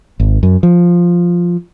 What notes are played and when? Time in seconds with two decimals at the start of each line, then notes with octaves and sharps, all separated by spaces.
0.20 G#1
0.43 F#2
0.63 F3